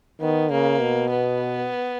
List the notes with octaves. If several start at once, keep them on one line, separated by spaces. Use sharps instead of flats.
D#3 B3
C#3 A#3
B2
B3